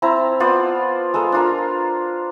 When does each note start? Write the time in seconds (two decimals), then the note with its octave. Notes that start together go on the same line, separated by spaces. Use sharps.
0.02 C4 E4 A5 A#5
0.40 B3 F4 C5 D5
1.14 G#3 A4 C5 A#5
1.32 D4 F4 A#4